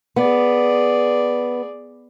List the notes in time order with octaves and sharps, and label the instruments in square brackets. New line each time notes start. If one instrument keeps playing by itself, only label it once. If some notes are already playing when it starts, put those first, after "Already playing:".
[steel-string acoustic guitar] B3 [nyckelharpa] G#4 D5